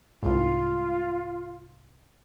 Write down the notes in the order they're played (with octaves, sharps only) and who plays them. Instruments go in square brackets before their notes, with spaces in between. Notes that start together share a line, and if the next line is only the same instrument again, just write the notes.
[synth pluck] C2 G#2 [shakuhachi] F4